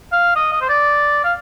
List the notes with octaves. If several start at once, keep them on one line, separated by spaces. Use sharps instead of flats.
F5
D#5
D#5
C5
D5
F5